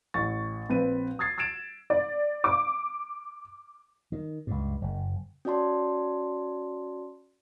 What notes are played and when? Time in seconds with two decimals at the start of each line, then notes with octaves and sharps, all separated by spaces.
0.14 A1 C#6 A6
0.69 A#1 C4 B4 D#7
1.19 D#6 E6 G#6 A6 C7
1.38 E6 G#6 A6 D7 E7
1.90 D5
2.44 D6
4.12 D#3
4.47 C#2 G2
4.82 F#1
5.45 C#4 F#4 D5 A5 C6